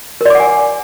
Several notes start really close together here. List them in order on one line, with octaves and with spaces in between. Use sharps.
A#4 D5 D6 F#5 G#5